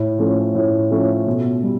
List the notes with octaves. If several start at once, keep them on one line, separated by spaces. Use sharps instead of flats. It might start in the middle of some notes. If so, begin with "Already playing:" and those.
Already playing: A2
F3 A3 C#4
A2
F3 A3 C#4
B2
G3